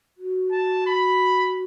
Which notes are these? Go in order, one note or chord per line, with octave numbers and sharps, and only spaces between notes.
F#4
A5
B5